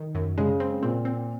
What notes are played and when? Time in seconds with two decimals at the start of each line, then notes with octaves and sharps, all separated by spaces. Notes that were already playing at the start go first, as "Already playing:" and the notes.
Already playing: D#3
0.15 F#2
0.38 C#3 G#3
0.60 C4
0.82 A#2 C4
1.05 C4